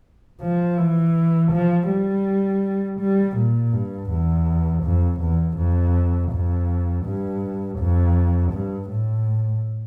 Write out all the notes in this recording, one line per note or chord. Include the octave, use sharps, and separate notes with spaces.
F3
E3
F3
G3
G3
A#2
G2
E2
F2
E2
F2
F2
G2
F2
G2
A2